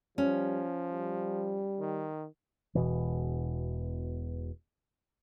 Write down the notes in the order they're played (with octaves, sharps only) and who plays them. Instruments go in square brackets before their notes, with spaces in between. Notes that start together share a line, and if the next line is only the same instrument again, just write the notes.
[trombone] F3 [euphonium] G3 [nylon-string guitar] C#4
[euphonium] G3
[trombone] D#3
[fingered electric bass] E1 B2 E3